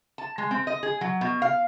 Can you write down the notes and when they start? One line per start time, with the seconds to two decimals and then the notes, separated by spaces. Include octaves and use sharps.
0.18 A5
0.38 G#3
0.51 C4
0.67 D#5
0.83 G#4
1.01 F#3
1.21 B2
1.42 F5